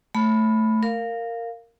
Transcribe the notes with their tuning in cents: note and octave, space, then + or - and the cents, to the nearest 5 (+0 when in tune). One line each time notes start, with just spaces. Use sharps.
A3 +0 B5 +0
A#4 -15 F5 +0